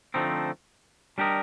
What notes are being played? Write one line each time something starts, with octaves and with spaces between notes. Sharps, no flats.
D3 F3 A3 C4 D#4
G3 D4 G4 A#4 D#5